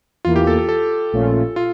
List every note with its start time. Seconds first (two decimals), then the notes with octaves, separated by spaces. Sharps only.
0.25 E2 E3 A#3 F4
0.36 G4
0.47 A4
0.58 A4
0.69 A4
1.12 A#1 A#2 A3 C#4 F4
1.56 F4